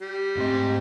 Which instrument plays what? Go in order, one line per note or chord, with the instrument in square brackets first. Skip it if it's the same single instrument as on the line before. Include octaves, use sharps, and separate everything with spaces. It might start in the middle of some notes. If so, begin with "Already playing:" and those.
[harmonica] G3
[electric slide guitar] G#2 D#5 [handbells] A3 C4 C6